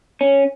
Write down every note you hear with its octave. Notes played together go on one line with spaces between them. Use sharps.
C#4